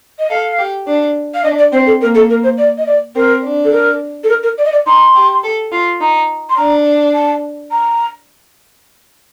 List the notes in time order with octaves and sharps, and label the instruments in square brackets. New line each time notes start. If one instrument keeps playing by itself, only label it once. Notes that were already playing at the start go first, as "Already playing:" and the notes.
[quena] D#5
[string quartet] A4 [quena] F5
[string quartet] G4
D4
[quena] F5
[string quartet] D4 [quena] D#5
[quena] D5
[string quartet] C4 [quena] C5
[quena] A4
[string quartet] A#3 [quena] A#4
[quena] A4
A#4
C5
D5
D#5
D5
[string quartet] C4 [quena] A#4
[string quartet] D4
[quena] A4
A#4
A4
A#4
A#4
D5
D#5
D5
[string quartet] D#4 [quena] C6
[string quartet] G4
A4
F4
D#4
[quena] C6
[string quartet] D4 [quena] A#5
[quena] A5
A#5